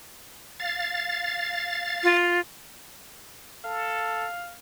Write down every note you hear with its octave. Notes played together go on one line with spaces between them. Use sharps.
F5 A6
F4
A4 F5